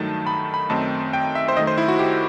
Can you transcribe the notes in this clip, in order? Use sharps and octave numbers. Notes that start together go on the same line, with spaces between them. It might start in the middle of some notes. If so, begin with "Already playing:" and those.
Already playing: G2 D#3 F#3 A3 D#4 A5
B5
B5
F#2 D#3 A3 C4 D#4 A5
G5
E5
C5
F#2 D#3 A3 D#5
C5
E4
F#4
G4